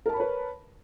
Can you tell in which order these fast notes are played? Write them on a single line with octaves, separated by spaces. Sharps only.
A#4 A5 B5 C#5 B4